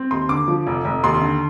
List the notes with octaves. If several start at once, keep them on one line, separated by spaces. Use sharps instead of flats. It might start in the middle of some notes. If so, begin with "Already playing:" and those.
Already playing: C4
D#2 C6
D3 D6
F3
F1
F1
D#2 C6
D3